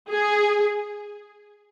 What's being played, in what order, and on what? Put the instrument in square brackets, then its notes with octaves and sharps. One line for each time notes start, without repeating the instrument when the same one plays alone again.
[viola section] G#4